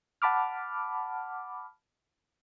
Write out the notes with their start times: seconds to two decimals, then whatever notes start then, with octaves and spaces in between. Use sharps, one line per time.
0.22 F#5 A5 B5 D6 F6